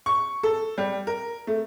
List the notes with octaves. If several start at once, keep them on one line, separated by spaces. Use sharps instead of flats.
C#6
A4
G3
A#4
A3